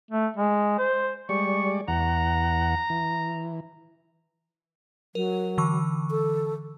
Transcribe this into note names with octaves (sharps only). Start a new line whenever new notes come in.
A3
G#3
C5
G3 G#3 D5 C#6
E2 F#5 A#5
E3
F#3 A#4
D3 E3 C#6
A4